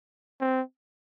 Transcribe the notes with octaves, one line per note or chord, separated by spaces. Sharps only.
C4